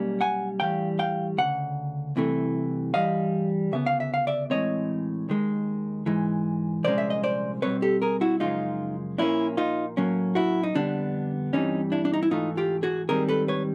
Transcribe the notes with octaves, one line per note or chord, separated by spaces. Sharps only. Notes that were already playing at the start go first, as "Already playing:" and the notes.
Already playing: B1 G3 A#3 C#4
F#5 G#5
A2 E3 G3 F5 G5
F5 G5
D2 C#3 F#5
C2 C3 E3 A3
G2 E3 G3 D#5 F5
D2 C#3 B3 E5
F5
E5
F5
D5 E5
A2 E3 G#3 C4 C#5 D#5
D#2 D#3 G#3
G#2 E3 G#3
C2 A#2 F3 G#3 C#4 C5 D5
E5
D#5
C5 D5
B2 G3 C4 B4 C#5
G4 A4
G#4 A#4
E4 F#4
F#2 C#3 F3 G#3 D#4 F4
A#2 F3 A#3 C#4 D4 E4
D#4 F4
A2 F#3 A#3 C#4
E4 F#4
D#4
F2 D3 G3 B3 D4
G2 E3 G3 C4 C#4 D#4
D4 E4
D4
D#4
E4
G#2 E3 A3 D#4 F4
F4 G4
F#4 G#4
G#2 D#3 G3 C4 G#4 A#4
A4 B4
B4 C#5